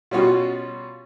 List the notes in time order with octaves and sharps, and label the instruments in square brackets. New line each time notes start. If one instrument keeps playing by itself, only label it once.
[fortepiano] B2 G3 C#4 F4 F#4